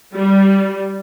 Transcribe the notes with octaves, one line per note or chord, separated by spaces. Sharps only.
G3